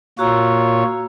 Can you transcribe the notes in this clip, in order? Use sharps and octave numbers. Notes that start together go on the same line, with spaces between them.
A#2 F4 F#4 C#5 A#5 E6